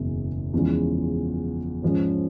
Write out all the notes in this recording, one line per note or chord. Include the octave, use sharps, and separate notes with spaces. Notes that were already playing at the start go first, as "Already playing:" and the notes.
Already playing: F#1 E2 B2 G#3
E2 C#3 F3 G#3
G#2 F3 G#3 C#4